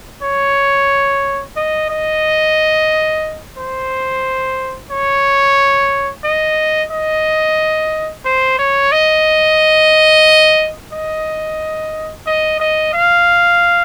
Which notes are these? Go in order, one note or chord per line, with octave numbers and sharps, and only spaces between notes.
C#5
D#5
D#5
C5
C#5
D#5
D#5
C5
C#5
D#5
D#5
D#5
D#5
F5